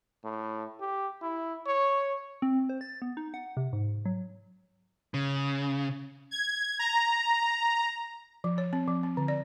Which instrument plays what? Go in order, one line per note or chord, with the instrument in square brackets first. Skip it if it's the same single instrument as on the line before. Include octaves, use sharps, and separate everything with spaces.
[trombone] A2
G4
E4
C#5
[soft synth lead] C4
C5
A6
B3
D#4
F#5
C3
G#2
F#3
[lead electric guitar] C#3
[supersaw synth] G#6
A#5
[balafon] F3
C#5
C4
F3
C4
D3
D5